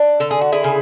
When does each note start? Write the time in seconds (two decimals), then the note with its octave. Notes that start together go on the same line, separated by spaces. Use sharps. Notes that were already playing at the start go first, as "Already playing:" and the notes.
Already playing: D4
0.20 D3 A4
0.31 G#4
0.41 F#4
0.52 E4 G#4
0.64 C#3